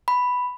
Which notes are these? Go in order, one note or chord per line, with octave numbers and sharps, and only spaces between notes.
B5